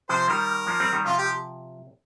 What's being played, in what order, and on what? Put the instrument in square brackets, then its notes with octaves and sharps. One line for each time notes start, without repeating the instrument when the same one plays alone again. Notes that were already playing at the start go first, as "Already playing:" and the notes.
[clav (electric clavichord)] C3 F3 [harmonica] C5
[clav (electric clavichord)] D#3 G3 [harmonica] A#4
[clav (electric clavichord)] F3 A#3
G3 C4
D#3 G3
[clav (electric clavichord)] C3 F3 [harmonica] F4
[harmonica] G4